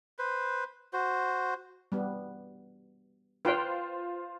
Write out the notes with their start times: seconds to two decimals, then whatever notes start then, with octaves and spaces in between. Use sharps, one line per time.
0.19 B4 C5
0.93 F#4 C5
1.92 G3 B3
3.45 F4 B4 C5 F5 G5